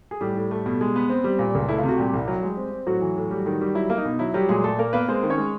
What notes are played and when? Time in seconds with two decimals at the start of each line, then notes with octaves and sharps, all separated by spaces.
0.11 G#4
0.21 A2 G3 G4
0.36 A2
0.51 A3
0.66 B2
0.81 G#3
0.96 B3
1.10 C4
1.24 G3
1.39 A#2
1.55 C#2
1.68 A3 E4
1.78 C3 F4
1.89 F#4
1.98 A#2 G3 G4
2.14 C2
2.28 F#3
2.43 G#3
2.57 C4
2.72 C4
2.87 A2 F#3 F#4
3.01 E3
3.16 A2
3.31 G3
3.46 D#3
3.61 G3
3.75 F#3 E4
3.90 A#3
3.98 D#4
4.05 B2
4.19 F#3 E4
4.34 F#3 G3 G4
4.49 A#2 G#3 G#4
4.64 A#2 A3 A4
4.79 A#3 A#4
4.93 A#3 B3 B4
5.08 G#3 C4 C5
5.23 D#3
5.30 C#4 C#5
5.38 G#3